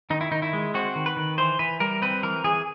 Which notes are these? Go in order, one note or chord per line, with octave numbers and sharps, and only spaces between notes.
D#3 D#4
E4
D#3 D#4
E4
G#3
C4 F#4
D#3
B4
D#3
E3 C5
E3 B4
G3 A#4
C4 B4
E3 A#4
E3 G#4